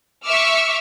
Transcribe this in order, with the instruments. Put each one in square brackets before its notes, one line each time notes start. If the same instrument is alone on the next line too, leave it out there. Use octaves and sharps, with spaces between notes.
[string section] E5 C#6 D6 E6 F6